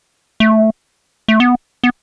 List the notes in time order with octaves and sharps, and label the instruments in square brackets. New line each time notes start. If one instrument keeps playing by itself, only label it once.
[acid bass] A3
A3
B3
B3